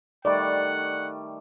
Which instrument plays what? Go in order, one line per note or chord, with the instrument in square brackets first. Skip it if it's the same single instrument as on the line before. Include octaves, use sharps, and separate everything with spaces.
[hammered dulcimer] D#3 G3 A3 [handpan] D5 [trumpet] F#5